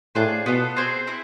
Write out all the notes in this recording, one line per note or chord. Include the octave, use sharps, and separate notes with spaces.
A2 D4 F4 G#4 C5
B2 B3 F4 A4
C4 G#4 C5 G#5
C4 E4 G#4